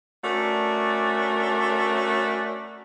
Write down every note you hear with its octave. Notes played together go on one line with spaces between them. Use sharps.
A3 C#4 D4 F#4 A#4